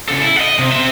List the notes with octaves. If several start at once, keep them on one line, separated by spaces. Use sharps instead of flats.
C#3 A4
E4
D#5 F#5
C3
C4 E5